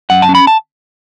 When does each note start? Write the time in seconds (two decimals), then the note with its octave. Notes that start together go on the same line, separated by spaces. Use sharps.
0.10 F#2 F#5
0.22 A5
0.29 C#4
0.35 B5
0.47 A5